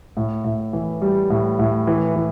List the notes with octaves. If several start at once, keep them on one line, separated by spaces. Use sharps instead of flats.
A2
A2
E3
G3
A2
A2
E3
E3